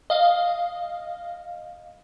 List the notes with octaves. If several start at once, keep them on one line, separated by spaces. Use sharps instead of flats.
D#5 F5